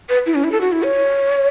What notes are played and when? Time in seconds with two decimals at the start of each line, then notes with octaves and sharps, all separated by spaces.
0.09 B4
0.26 E4
0.35 C#4
0.44 E4
0.52 A4
0.61 F#4
0.72 E4
0.83 C#5